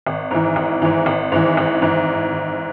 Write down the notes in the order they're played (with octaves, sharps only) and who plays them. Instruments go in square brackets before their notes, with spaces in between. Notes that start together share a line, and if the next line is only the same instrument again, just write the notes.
[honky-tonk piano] G#1
G#2 E3
G#1
G#2 E3
G#1
G#2 E3
G#1
G#2 E3